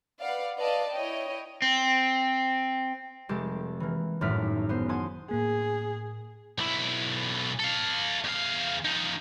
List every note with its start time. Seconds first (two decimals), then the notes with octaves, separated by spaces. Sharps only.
0.20 B4 D5 F5 F#5
0.59 B4 D5 D#5 F5 A5
0.93 E4 C#5 D#5 G5
1.62 C4
3.29 F1 G#3 G4 A4 A6
3.80 E3 A#3
4.21 G#1 F#2 A2 A3 F6 B6
4.69 B3 C5
4.89 C5 F#5 G#5 A5 C6 D#6
5.31 A2 A#3 G#4
6.58 B1 E4
7.59 A4 F5
8.24 E2 F5
8.85 F3 D#4